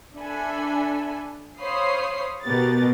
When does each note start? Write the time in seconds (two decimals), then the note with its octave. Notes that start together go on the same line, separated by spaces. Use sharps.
0.16 D4 A4 E5 G#5 B5
1.60 C5 C#5 F5 B5 D#6 C7
2.44 B2 B3 G4 A#4 A6